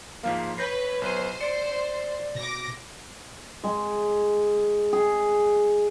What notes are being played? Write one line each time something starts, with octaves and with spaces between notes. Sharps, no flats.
G#2 F3 A#3 F5
B4 C#5 G6 A#6 C7
B1 B4 C5 D#7
D5 C#7 D7
D5
B2 D6 A#6
G#3
G#4